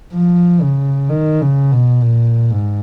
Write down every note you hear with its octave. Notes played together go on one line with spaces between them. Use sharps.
F3
C#3
D#3
C#3
B2
A#2
G#2